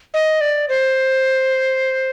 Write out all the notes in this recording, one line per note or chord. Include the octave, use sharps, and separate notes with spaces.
D#5
D5
C5